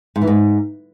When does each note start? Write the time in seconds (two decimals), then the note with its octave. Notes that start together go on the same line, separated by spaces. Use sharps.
0.16 G#2
0.22 E3
0.27 G#2